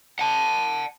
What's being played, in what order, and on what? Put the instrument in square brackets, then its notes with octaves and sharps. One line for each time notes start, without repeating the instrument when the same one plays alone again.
[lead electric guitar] F#5 A5